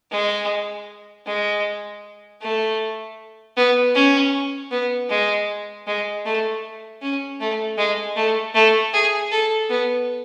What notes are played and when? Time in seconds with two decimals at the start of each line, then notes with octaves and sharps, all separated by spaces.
0.11 G#3
1.26 G#3
2.41 A3
3.57 B3
3.95 C#4
4.71 B3
5.09 G#3
5.87 G#3
6.25 A3
7.02 C#4
7.40 A3
7.78 G#3
8.16 A3
8.55 A3
8.93 G#4
9.32 A4
9.70 B3